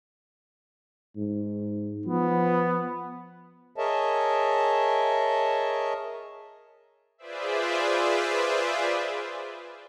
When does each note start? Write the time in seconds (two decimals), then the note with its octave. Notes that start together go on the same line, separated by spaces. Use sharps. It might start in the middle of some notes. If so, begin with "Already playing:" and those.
1.16 G#2
2.06 F3 B3
3.76 G#4 A#4 C#5 D#5 E5 A5
7.18 F4 G#4 B4 C5 D5 E5